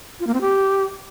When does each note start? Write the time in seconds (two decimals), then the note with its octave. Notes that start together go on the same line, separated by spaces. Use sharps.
0.20 F4
0.27 A#3
0.34 C4
0.41 G4